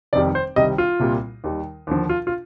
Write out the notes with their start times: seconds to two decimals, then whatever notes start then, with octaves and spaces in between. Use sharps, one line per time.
0.13 F1 F2 D#3 G3 D5
0.35 C5
0.56 C2 C3 D#3 G3 D#5
0.78 F4
1.00 C2 A#2 G3
1.44 D#2 D#3 G3
1.87 D#2 D3 F3
2.09 F4
2.27 F4